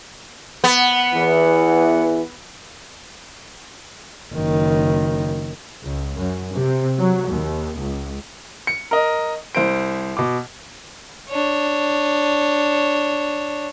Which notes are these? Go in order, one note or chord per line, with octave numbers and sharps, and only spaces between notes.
B3
E2 E3
F#1 D#3
C#2
F#2
C3
F#3
D#2
C#2
C#7
A#4 D#5
C2 C5 D7
B2 D6
D4 C#5